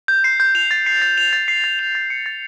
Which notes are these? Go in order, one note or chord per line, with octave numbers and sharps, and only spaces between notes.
G6
C7
G6
F7
A6
C7
A6
F7
A6
C7
A6
F7
A6
C#7
A6